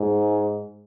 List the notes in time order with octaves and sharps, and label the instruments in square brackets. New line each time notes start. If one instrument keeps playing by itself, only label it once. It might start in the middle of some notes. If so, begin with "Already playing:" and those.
Already playing: [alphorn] G#2